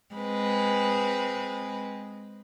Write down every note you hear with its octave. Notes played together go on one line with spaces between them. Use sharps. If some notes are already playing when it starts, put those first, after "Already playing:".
G#3 C4 B4